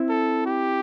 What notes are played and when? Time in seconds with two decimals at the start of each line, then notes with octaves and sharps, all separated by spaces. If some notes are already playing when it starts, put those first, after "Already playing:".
Already playing: C4 E4
0.09 A4
0.46 G4